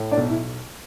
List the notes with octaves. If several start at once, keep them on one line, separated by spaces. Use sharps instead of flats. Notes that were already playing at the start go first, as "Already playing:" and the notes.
Already playing: A2
D4 D5
B1
E4